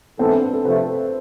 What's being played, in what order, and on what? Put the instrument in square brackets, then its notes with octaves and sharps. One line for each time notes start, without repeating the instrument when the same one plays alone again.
[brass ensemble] G#2 E3 B3 E4 A4 [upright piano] C4
[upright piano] D4
B4
A4
[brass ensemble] C3 F3 A3 [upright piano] B4
[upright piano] A4